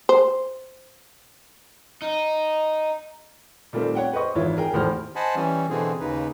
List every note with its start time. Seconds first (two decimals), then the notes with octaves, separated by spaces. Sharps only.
0.09 C5
2.02 D#4
3.73 A#2 D#3 G3 A3 A#3 C4
3.95 C#5 F#5 G5
4.13 B4 C5 D#5 C#6
4.35 G#1 E3 E4 F4 C#5
4.57 G#4 A#4 G5
4.73 G#1 E2 A2 G4 C5 F6
5.16 C5 D#5 F#5 G#5 A5 B5
5.35 E3 G3 C#4
5.69 B2 D3 E3 C4 G#4
6.00 D#2 C#3 D#4 B4